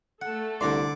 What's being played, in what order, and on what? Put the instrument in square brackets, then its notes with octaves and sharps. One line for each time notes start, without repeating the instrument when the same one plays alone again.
[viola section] A3 A4 [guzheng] F#5
[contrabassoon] C2 [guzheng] D3 A#5 C6 [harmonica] D5